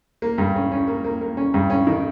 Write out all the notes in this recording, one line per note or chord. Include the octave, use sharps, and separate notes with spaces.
A#3
G2
C#4
C#4
A#3
A#3
A#3
C#4
G2
C#4
D#3